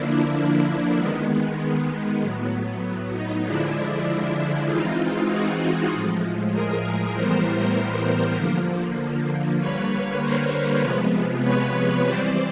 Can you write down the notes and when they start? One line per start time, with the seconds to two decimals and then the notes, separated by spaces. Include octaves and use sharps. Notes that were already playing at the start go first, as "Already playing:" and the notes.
Already playing: D3 F3 A#3 D4 E4
0.37 D4 E4
0.98 D#3 G#3 B3
2.21 A2 F#3 B3
3.13 D#4
3.44 D3 F3 G#3 D4 E4
4.67 E3 G#3 C4 D#4 F4
5.29 F#4 G#4
5.90 A2 F3 G#3
6.51 G#4 A#4
7.13 A2 E3 G3 B3 A#4 C5
8.36 D3 F3 A#3
9.59 D3 G3 A#3 B4 C#5
10.20 A#4 C5
10.81 C3 F3 G#3 B3
11.42 B4 C#5
12.04 E3 G3 C4 C5 D5